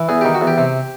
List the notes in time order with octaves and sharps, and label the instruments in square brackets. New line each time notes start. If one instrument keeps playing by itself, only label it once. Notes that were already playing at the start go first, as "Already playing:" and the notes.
Already playing: [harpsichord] E3
E2 G#4
D#3 G4
F#4
E2
G4
C3